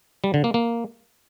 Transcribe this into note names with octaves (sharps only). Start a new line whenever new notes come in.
G3
D3
A#3
A#3